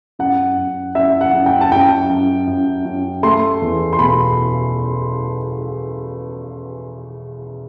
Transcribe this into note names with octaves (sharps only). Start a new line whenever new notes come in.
F#2 F#5
F#2
F#2 E5
F#5
F#2
G5
A5
F#2 G5
F#2
F#2
F#2
A3 C6
E2
C6
B2 B5